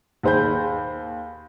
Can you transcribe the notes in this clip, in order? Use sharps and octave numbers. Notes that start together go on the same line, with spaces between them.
D#2 G#4 C5 B5 G6